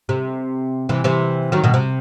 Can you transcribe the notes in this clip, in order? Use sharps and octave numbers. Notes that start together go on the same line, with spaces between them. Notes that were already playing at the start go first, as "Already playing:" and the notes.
C3
C3 E3
C3 E3
D#3 F#3
B2 D#3
C3